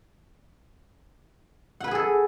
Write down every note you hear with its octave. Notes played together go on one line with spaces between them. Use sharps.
G#4 A4 B4 F#5 G#5